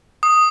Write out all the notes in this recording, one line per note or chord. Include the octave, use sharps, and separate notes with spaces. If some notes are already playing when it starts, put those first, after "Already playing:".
D#6